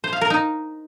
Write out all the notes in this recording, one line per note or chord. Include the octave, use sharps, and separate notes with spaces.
C5
F5
A#4
D#4